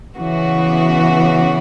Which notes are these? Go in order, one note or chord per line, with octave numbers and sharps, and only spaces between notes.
C#3 E3 B3 F#4